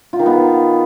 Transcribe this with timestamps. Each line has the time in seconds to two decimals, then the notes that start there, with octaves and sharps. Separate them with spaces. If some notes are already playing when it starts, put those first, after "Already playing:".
0.13 F4
0.19 D#3
0.26 B3